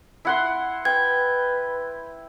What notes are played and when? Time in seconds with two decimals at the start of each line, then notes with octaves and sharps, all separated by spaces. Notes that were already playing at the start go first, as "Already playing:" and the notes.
0.25 E4 F#5 C6
0.85 B4 G5 G#6